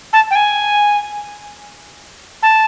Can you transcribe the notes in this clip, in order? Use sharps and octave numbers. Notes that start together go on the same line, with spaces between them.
A5
G5
G#5
A5